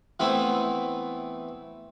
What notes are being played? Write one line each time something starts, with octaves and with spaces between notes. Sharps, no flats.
E3 A3 B3 C4 E4